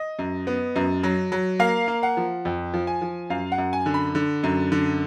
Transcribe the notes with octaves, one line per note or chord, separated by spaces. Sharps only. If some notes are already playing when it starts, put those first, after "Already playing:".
Already playing: D#5
F#2
B3
F#2
F#3
F#3
A#3 F5
A#3
F#5
F3
F2
F3
G#5
F3
F#2 F5
F#5
F#2
G#5
D3
B5
D3
F#2
D3